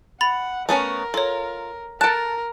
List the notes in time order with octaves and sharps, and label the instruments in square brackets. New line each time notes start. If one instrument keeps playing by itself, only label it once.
[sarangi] F#5 [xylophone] B5 A6 F7
[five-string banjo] A3 B3 C#4 [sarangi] A#4
[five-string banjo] F4 [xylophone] A4 C#5
[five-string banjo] A4 A5 [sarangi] A#4 [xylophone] F#6 D7